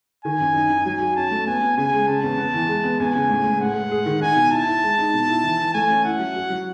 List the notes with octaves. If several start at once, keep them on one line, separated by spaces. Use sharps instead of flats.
D#3 G#5
F#2
D#4
D#4
F#3 G#5
F#4
C#4 A5
A3
B3 G#5
B3
C#3 G#5
G#3
C#3 A5
E2
B3
E3
G#3
B3
E2 G#5
C#3
A2
G#3
A2 F#5
G#3
G#4
D#3
D#4 G#5
B2
E4 A5
E4
G#3
D#4
B2
E4
E3
E3
A3 G#5
C#4
E4 F#5
F#3
F#4
F#3